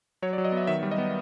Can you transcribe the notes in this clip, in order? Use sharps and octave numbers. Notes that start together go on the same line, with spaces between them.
F#3 C#5
D5
F#3
D#5
B3 E5
D#3 E5
G3
D#5
B3